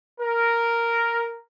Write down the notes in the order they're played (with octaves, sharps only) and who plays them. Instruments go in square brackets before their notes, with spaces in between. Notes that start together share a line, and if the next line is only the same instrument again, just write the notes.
[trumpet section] A#4